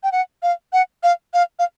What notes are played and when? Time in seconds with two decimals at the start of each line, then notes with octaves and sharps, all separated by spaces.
0.03 G5
0.12 F#5
0.43 F5
0.73 F#5
1.03 F5
1.34 F5
1.59 F5